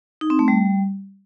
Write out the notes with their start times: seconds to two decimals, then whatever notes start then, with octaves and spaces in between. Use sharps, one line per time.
0.21 D#4
0.30 C4
0.39 A3
0.48 G3